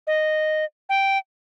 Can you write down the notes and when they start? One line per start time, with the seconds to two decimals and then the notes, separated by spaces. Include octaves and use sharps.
0.07 D#5
0.89 G5